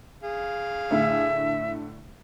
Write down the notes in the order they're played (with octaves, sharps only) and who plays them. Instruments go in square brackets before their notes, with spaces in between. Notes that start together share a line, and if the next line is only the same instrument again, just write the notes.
[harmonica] G#4 F5
[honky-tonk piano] A2 D3 A3 [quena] E5